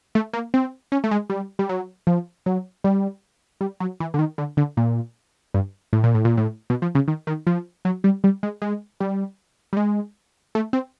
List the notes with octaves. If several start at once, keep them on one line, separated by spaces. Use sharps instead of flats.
A3
A#3
C4
C#4
A3
G#3
G3
G3
F#3
F3
F#3
G3
G3
F#3
E3
D3
D#3
D3
D3
A#2
G2
A2
A#2
A2
A#2
A2
B2
F3
C#3
D#3
D#3
F3
F#3
G3
G3
G#3
G#3
G3
G3
G#3
A3
C4